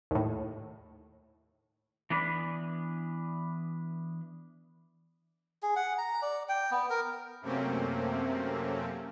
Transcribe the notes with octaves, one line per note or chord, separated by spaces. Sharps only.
D#2 A2
E3 B3 D4 B4
G#4
F#5
A#5
D5
G5
B3
A#4
F#2 C3 A3 A#3 C4 C#4